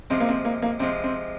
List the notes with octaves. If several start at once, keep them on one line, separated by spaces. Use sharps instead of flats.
C3 F3 G#3 C4
A#3
C4
A#3
A#3
C3 F3 G#3 C4
C4